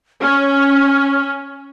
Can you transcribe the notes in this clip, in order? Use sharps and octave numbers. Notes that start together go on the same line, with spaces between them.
C#4 F6